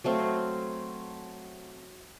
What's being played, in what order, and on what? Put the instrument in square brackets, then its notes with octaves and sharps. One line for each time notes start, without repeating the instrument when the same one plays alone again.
[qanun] F#3 A3 C4 F5